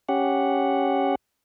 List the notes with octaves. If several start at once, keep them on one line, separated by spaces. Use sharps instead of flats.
C#4 G4 F#5